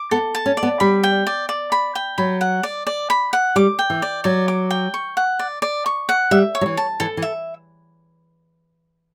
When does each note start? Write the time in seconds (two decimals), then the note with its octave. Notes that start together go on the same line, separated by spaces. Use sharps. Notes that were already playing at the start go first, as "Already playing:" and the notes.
Already playing: D6
0.11 B3 A4
0.35 A5
0.46 C#4
0.57 D5
0.63 B3
0.80 G3 B5
1.03 G5
1.27 D5
1.49 D5
1.72 B5
1.95 G5
2.18 F#3 B5
2.41 F#5
2.63 D5
2.87 D5
3.10 B5
3.33 F#5
3.56 G3 D6
3.79 G5
3.90 E3
4.02 D5
4.24 F#3 D5
4.48 D6
4.71 G5
4.94 C#6
5.17 F#5
5.39 D5
5.62 D5
5.86 C#6
6.09 F#5
6.31 G3 E5
6.55 C#5
6.61 F#3
6.66 E3
6.77 A5
7.00 E3 A4
7.17 E3
7.22 E5